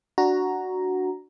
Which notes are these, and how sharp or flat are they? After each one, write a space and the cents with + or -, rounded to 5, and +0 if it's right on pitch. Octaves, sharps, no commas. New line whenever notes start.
D4 +0 F#4 +0 A#5 +0